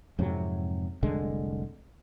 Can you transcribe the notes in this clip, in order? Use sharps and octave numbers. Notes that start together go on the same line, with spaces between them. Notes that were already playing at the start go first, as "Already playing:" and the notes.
F2 G#2 C3 F#3
F1 C2 D3 G#3